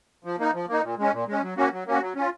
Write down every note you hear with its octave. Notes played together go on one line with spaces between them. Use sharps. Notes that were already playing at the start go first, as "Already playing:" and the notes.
F3
A#3 D#4
F3
A#3 D#4
A#2
G#3 C#4
A#2
G#3 C#4
F#3
A#3 C#4 F#4
F#3
A#3 C#4 F#4
F#3
C#4 F4